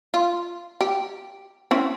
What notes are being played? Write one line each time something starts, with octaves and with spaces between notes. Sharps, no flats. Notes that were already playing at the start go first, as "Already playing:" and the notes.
F4
G4
C4 C#4 E4